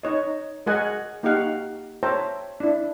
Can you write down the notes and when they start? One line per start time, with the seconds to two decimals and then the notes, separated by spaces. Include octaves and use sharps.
0.03 D#4 C#5 D#5
0.66 G#3 F#4 A#4 D#5 F#5 G#5
1.23 A#3 D#4 F#4 G4 F5 F#5
2.03 C5 C#5 E5 G5 A5 A#5
2.60 D4 E4